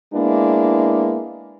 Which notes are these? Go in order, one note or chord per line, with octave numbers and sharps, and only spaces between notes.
G#3 A#3 B3 D4 E4